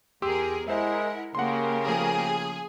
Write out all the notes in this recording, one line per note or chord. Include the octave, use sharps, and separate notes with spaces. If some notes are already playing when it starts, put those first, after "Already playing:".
E2 G4 G#4 A#4 C6 E6
G#3 E4 A#4 C5 E5 F#5
C#3 A#3 G4 A#4 F#5 C6
F3 A3 G#4